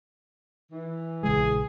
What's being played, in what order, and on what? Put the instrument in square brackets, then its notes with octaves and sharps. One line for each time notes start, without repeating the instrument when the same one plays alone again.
[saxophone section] E3
[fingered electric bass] A#1 C#3 G#3 [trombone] G#4